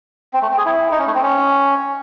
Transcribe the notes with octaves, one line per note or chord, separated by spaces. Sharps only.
C4
A3
C4
G#4
E4
D#4
C#4
A3
C4
C#4